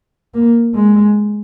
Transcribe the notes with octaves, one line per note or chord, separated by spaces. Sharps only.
A#3
G#3